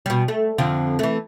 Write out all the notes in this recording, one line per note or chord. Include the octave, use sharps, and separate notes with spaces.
B2 G3
A3
F2 D3 F3
E3 A3